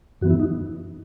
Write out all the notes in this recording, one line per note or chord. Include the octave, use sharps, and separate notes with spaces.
F#2 E3 B3 F#4
E4
D#4